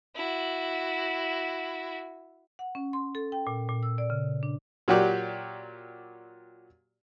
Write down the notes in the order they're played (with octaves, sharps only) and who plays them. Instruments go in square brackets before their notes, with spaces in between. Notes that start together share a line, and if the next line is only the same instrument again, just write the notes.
[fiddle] E4 F#4
[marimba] F#5
C#4
C6
A4
G5
A#2
A#2
E6
D5
C#3
D4
[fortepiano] A#2 F#3 F#4 G4 D5